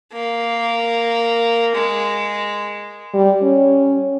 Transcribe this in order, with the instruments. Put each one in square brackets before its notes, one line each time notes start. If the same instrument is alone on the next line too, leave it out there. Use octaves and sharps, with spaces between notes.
[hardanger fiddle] A#3
G#3
[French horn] G3
C#4